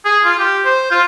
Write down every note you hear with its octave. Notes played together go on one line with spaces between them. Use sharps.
G#4
F4
G4
C5
F4